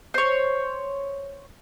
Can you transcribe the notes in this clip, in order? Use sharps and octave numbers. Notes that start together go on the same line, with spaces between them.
C5 C#5